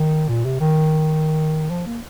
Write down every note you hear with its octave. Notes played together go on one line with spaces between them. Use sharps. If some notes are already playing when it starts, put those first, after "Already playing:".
Already playing: D#3
A#2
C3
D#3
F3
A#3